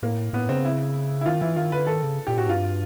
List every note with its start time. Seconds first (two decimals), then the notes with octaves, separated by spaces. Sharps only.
0.03 A2 A#3
0.33 A2 B3
0.49 C#3 C4
0.65 E4
1.21 E4
1.26 D#3 F4
1.41 E3 E4
1.56 D#3 F4
1.72 D3 B4
1.87 D#3 A4
2.03 C#3
2.27 A#2 G4
2.38 A2 F#4
2.48 G2 F4